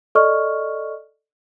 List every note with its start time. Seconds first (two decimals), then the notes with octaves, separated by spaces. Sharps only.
0.15 A4 D5 D#5 C#6 F6